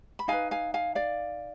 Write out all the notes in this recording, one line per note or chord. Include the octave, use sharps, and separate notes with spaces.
B5
D#4 B4 F5 G#5
F5 G#5
F5 G#5
D5 F5